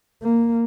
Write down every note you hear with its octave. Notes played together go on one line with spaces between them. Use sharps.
A#3